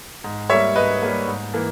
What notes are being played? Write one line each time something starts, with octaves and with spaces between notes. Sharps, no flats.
G#2
G3 A#3 C#5 E5
G#2 B4 D#5
G3 A#3
G#2
E3 A#3